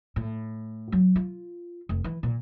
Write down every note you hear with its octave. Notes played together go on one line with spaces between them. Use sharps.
A2
F#3
F4
F1
E3
A#2